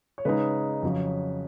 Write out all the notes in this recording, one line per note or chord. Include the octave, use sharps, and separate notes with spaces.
C#5
C#3 G#3 D#4 B4
F2 C#3 F#3